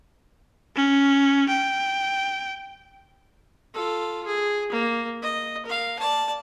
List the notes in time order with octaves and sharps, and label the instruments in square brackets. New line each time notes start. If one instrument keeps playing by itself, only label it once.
[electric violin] C#4
G5
[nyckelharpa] F4 A4
G#4
A#3
D#5
A#4 F5
D5 A5